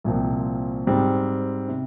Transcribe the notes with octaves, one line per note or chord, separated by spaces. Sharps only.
C2 A#2 F3 C4
G#2 G3 C4
C3